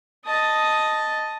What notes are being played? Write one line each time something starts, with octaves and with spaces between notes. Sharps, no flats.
D#5 A5